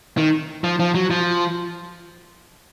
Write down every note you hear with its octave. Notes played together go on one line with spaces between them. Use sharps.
D#3
F3
F3
F#3
F3